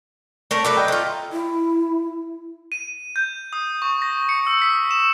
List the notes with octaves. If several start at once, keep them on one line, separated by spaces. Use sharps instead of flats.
A3 A#4 C#5
F#3 A4 B4 D5 E5 D6
D#5 G5 A#5
A3 F4
E4
D#7
G6
D#6
C#6
A#6
C#7
E6
B6
E7